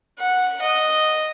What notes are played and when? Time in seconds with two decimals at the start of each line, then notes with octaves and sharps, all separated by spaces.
0.19 F#5
0.61 D#5